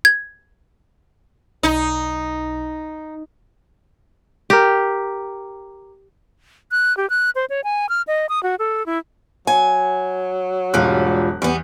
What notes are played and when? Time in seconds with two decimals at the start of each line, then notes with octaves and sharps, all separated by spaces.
0.05 G#6
1.63 B1 D#4
4.50 G4 A#4
6.71 F#6
6.97 G4
7.10 F#6
7.35 C5
7.50 C#5
7.64 G#5
7.89 F6
8.07 D#5
8.29 D#6
8.43 F#4
8.59 A4
8.86 E4
9.47 F#3 G#5
10.74 E1 G#2 G3 F4 F#6
11.42 E2 G3 B3